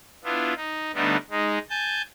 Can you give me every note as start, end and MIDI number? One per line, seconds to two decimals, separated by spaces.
0.24 0.53 59
0.24 0.53 62
0.24 0.53 64
0.24 0.53 65
0.56 0.91 63
0.94 1.17 50
0.94 1.17 55
0.94 1.17 57
0.94 1.17 59
0.94 1.17 62
0.94 1.17 63
1.30 1.58 56
1.30 1.58 63
1.70 2.02 80
1.70 2.02 81
1.70 2.02 91